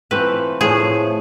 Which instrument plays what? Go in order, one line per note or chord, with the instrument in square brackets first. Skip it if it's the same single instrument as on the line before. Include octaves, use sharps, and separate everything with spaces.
[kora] E3 A3 C4 F4 [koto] B4
[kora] A2 F3 A3 [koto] G#4